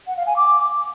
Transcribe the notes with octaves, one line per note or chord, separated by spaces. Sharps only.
F#5
F5
G#5
D6